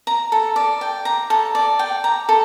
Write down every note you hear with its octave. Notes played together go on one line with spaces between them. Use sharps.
A#5
A4
D5
G5
A#5
A4
D5
G5
A#5
A4